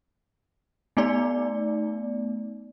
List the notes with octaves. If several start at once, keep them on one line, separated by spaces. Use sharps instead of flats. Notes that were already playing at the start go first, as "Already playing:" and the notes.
A3 B3 D#4 D5